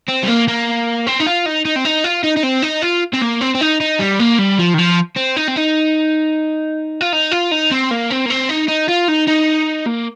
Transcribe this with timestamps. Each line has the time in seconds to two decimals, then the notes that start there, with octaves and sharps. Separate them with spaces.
0.09 C4
0.23 G3
0.28 A#3
0.48 A#3
1.07 C4
1.20 D#4
1.26 F4
1.46 D#4
1.65 D#4
1.76 C4
1.85 D#4
2.04 F4
2.24 D#4
2.37 D#4
2.43 C4
2.63 D#4
2.83 F4
3.13 C4
3.21 A#3
3.41 C4
3.54 C4
3.61 D#4
3.81 D#4
3.99 G3
4.19 A#3
4.39 G3
4.59 F3
4.74 D#3
4.78 F3
5.17 C4
5.37 D#4
5.48 C4
5.56 D#4
7.01 F4
7.13 D#4
7.31 F4
7.51 D#4
7.71 C4
7.91 A#3
8.10 C4
8.26 A#3
8.30 C4
8.49 D#4
8.69 D#4
8.89 F4
9.09 D#4
9.28 D#4
9.86 A#3